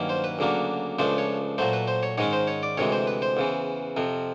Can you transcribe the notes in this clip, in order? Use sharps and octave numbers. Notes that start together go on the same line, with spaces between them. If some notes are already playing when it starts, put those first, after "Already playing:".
Already playing: G2 D#3 F#3 A#3 C#4
C5
B4
D2 C#3 F#3 A#3 D4
C#2 C#3 F3 A3 D4 C5
C#5
A#2 F#3 A3 C5
B4
C5
C#5
G#2 D#3 G#3 C#4 C#5
C5
C#5
D5
D2 C3 E3 G#3 C#5
C5
B4
C5
E2 C#3 E3
F2 C3 F3